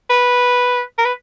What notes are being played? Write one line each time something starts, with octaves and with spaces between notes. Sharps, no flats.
B4
A#4
B4